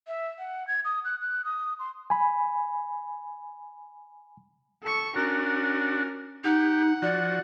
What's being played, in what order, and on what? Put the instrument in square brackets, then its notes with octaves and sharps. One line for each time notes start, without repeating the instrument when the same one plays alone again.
[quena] E5
F#5
G#6
D#6
F#6
F#6
D#6
C6
[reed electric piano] G#5 B5
[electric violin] A4 C#6
[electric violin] C#4 A#4 [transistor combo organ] D4 F#4
[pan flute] D#4 [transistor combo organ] G4 [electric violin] F#5
[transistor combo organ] F3 F#4 [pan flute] D5